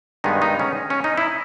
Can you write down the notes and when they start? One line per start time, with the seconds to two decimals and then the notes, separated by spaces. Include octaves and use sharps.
0.24 G2 D#3 G#3 B3 D#4
0.42 D#4
0.59 C#4
0.90 C#4
1.04 D#4
1.17 E4